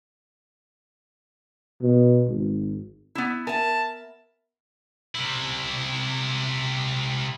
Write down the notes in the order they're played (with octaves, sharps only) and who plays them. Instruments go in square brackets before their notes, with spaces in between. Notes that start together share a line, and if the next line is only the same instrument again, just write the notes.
[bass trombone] B2
G#1
[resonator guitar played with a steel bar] B3 E4
[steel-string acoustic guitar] A#4 E5 [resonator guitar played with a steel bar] G#5 [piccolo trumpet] A5
[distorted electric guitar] C3 E4